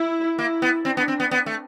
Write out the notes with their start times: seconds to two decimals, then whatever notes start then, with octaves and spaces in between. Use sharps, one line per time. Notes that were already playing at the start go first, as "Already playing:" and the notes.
Already playing: E4
0.38 A#3 E4
0.62 B3
0.84 C4 D4
0.97 B3
1.08 C4
1.20 B3
1.31 B3
1.46 A3